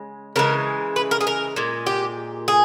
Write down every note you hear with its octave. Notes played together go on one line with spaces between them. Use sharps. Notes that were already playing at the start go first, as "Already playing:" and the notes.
Already playing: C#3 G#3
C#3 E3 G#3 A#4
B4
A#4
G#4
A#4
A#2 G#3
G4
G#4